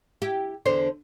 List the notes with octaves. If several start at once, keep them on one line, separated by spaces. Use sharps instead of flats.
E4 G4
E2 D3 C5